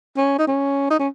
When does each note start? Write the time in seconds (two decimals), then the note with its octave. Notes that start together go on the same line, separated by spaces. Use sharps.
0.17 C#4
0.39 D#4
0.48 C#4
0.91 D#4
0.99 C#4